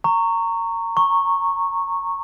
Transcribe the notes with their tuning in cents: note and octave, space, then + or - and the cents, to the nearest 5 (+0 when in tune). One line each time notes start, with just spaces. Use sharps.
A#5 -20 C#6 +0
A#5 -10 C#6 -10